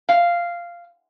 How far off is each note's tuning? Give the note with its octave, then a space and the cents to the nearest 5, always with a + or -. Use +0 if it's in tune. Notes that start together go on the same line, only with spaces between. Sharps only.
F5 -10